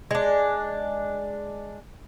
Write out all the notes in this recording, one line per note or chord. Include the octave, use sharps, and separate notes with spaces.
G#3 D4